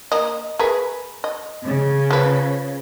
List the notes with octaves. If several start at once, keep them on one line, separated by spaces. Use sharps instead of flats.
A#3 D#5
G#4 A#4 B4
D#5
C#3
F3 B4